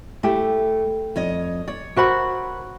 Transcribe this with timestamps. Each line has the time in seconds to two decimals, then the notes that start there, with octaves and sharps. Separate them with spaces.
0.23 A3 E4 G4
1.16 F2 C#5 D#5
1.68 C#5 D5
1.96 F#4 A#4 C5 E5 B5